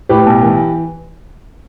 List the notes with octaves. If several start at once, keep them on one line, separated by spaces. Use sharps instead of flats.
A2 G4 B4
B1
E3